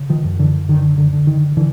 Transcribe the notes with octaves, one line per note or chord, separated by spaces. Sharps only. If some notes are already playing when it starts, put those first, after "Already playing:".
Already playing: C#3
D#3 F3
F#2
D3 E3
D3 D#3
D3
D3
D#3
D3 E3